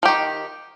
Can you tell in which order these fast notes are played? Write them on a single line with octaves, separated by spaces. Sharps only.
F3 G4 D#3